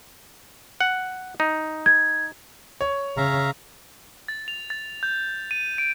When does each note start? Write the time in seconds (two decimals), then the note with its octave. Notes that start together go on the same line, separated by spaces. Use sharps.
0.81 F#5
1.40 D#4
1.86 G#6
2.81 C#5
3.17 C#3 E5 F5 A#5
4.28 A6
4.48 F7
4.70 A6
5.03 G6
5.51 D#7
5.78 D7